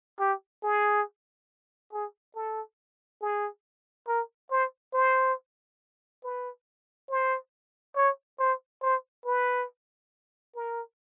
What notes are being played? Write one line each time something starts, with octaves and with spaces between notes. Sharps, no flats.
G4
G#4
G#4
A4
G#4
A#4
C5
C5
B4
C5
C#5
C5
C5
B4
A#4